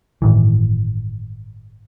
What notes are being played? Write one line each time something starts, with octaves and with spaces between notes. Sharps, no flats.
G1 A2 D#3 E3